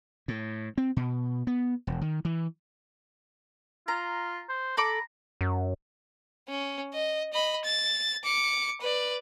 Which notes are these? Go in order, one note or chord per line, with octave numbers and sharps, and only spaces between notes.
A2
C4
B2
B3
E1
D#3
E3
F4 A#5
C5
A4 A#5 B5 D6
F#2
C#4
D#5
D#5 B5
A6
D6 C#7
B4 D5